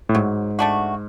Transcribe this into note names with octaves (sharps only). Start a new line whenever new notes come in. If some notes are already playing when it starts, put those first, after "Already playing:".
A2
G#2 F#3
A3 D4 F#4